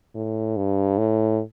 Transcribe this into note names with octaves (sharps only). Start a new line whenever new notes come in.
A2
G2
A2